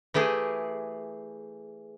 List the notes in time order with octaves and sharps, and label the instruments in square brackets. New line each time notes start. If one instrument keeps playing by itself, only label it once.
[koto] E3 A3 G4 G#4